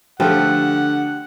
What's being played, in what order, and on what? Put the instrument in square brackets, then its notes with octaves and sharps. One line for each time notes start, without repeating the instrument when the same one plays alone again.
[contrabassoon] D3 [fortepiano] F3 A3 [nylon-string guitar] G4 [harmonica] F#5